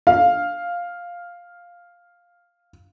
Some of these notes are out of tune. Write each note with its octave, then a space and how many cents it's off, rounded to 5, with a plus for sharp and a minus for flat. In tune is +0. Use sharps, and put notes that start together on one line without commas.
F5 +5